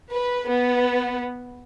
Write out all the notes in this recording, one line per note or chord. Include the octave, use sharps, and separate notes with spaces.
B4
B3